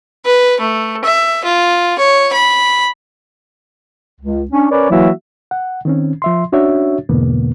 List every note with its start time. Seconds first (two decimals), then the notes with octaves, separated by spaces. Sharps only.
0.25 B4
0.60 A3
1.04 E5
1.44 F4
1.98 C#5
2.32 B5
4.21 C#2
4.51 C#4 D4
4.71 C#4 A#4 B4 C#5 D5
4.91 E3 F#3 A#3 E4 F#4 E5
5.51 F#5
5.85 D#3 C4 C#4
6.22 F3 E5 C6
6.52 C#4 D4 F#4 C#5 E5
7.09 E2 G#2 B2 D3 A#3 B3